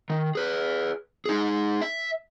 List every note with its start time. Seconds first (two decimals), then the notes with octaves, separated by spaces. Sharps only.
0.10 D#3
0.35 G#4 B4
1.26 D#4 G#4
1.82 E5